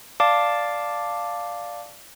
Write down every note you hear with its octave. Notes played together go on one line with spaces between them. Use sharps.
D5 F5 A5 D6